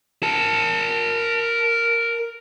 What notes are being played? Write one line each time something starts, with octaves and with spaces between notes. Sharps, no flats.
A#4 A5